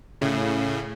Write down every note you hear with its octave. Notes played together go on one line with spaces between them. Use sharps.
A2 C#3